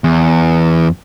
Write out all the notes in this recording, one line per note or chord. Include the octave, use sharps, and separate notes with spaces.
E2